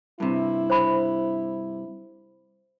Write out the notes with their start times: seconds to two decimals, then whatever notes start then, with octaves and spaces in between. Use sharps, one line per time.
0.20 G2 C3 E4
0.70 C5 B5